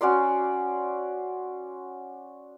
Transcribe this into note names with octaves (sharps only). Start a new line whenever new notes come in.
C#4 F#4 D5 C6